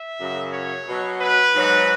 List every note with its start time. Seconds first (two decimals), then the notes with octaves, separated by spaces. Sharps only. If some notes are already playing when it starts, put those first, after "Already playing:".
Already playing: E5
0.19 F#2 C#3 F#3
0.53 C#5
0.88 B2 F#3
1.21 B4
1.55 G#2 F#3